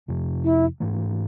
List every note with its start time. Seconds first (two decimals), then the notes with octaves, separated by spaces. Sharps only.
0.08 F2 C3 F3
0.44 E4
0.80 G#2 E3 A3